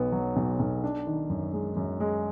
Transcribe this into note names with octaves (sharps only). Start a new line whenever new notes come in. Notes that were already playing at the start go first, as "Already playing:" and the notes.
Already playing: B1 B3
F#3
B1
B1
D4
D#3
F#2
G#3
F#2
G#3